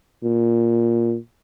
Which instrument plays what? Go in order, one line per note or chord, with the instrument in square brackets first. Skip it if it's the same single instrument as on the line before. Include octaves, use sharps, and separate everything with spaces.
[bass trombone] A#2